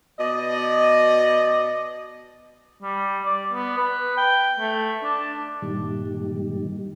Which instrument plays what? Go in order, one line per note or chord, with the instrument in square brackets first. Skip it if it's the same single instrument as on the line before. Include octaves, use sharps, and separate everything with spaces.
[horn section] B2 D5 D#5
[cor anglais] G3
D5
B3
B4
G5
A3
D4
[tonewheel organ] G2 A#2 D#3 G3